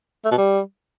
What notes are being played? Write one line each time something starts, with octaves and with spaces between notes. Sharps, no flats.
A3
B2
G3